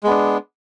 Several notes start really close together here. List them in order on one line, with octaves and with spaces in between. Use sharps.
G#3 B3 D4